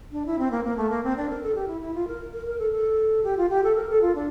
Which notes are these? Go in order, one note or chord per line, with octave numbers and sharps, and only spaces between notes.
D4
E4
C4
A#3
A#3
A3
A#3
C4
D4
A#4
A4
G4
E4
E4
F4
A#4
A#4
A#4
A4
A4
G4
F4
G4
A4
A#4
A4
F4
D4